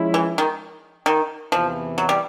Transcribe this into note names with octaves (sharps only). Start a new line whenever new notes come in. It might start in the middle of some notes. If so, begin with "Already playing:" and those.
Already playing: F3 G#3 C#4 E4
E3
D#3
D#3
E2 C3 E3 F3
F#3
G3